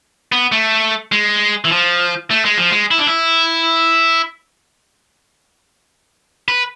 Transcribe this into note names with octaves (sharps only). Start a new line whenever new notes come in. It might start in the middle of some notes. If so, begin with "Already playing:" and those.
B3
A3
G#3
E3
F3
A3
G#3
F3
G#3
E4
D4
E4
B4